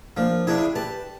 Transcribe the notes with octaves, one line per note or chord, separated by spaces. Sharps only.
F3 A#3 D4
C3 D4 E4 G#4
G4 B4 A5